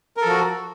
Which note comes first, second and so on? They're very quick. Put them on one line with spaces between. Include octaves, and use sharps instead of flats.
A#4 A4 F3 F#4